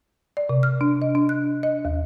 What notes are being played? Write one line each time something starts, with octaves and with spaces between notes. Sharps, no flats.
D5
C3
F6
D4
D#5
D4
F#6
D#5
D#2